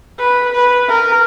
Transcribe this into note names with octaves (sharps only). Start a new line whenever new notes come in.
B4
B4
A#4